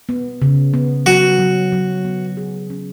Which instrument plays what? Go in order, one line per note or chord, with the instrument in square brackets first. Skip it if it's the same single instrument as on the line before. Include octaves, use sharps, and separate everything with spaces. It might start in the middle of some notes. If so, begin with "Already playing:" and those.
[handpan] B3
C#3
B3
[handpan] F#3 [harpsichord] F#4
[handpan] F#3
F#3
B3
G#4
C#4